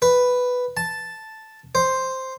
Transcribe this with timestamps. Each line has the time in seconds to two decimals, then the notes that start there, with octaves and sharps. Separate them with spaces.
0.02 B4
0.77 A5
1.75 C5